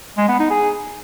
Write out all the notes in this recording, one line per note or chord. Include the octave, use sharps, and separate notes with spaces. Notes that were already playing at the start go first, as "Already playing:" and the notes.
G#3
B3
D#4
G#4